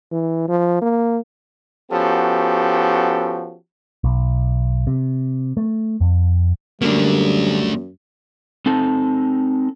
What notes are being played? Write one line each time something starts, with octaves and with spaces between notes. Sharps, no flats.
E3
F3
A#3
F3 B3 C#4 F#4 G4 A4
B1
C3
A3
F2
F#2 D3 G3 A3 A#3 D4
C4 D#4 A4 A5